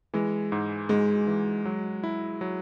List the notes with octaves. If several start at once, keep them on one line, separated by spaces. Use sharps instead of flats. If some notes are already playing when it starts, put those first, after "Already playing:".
E3 G#3
G#2
G#2 G#3
E3
F#3
E4
F#3